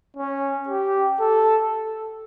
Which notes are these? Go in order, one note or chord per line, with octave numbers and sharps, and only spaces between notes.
C#4
G4
A4